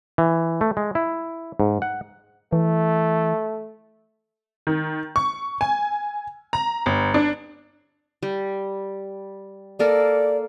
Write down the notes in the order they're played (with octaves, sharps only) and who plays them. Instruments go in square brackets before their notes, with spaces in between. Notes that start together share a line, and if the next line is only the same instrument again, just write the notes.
[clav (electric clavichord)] E3
A3
G#3
E4
G#2
F#5
[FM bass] E3 [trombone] A3
[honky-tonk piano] D#3
C#6
G#5
A#5
G1
D4
[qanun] G3
[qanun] A#3 A4 A#4 [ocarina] D5